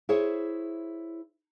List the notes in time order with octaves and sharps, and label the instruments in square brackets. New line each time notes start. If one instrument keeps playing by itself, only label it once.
[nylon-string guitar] E4 G#4 C5 C#5